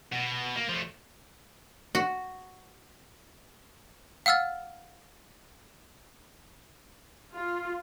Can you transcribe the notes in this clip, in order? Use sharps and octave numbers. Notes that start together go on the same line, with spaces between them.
B2
A#3
F3 A3
F#4
F5 F#5 E6 F6 A6
F4